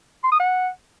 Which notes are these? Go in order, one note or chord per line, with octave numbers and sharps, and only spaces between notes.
C6
D#6
F#5